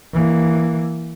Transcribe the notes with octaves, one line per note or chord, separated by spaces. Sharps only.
E3 A#3